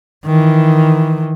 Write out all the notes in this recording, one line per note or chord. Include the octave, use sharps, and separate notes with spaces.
D#3 E3